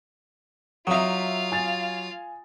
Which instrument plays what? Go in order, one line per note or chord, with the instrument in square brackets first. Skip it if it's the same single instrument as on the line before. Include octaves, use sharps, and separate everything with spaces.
[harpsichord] F#3 D#4 [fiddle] F4 F5 [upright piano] E5 D#6
[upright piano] G#5 A6